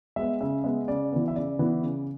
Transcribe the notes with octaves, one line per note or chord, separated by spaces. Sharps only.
G#3 B3 E5
C#3 E5
G#3 B3 E5
C#3 D5
E3 B3
E5
C#3 D5
E3 B3
C#3